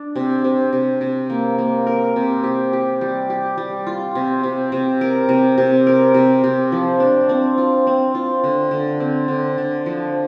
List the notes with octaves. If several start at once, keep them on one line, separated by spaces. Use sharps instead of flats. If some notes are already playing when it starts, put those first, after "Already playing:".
Already playing: D4
C3
C3
C3
C3
A#3
A#3
A#4
C3
G4
G4
G3
G4
G3
F4
C3
C3
C3
A#4
C3
C3
A#4
C3
C3
F3
D4
C4
F4
C4
F4
D3
D3
C4
D3
D3
F3